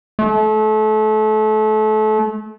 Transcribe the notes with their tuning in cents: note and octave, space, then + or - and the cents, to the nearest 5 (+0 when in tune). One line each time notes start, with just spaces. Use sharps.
A3 -30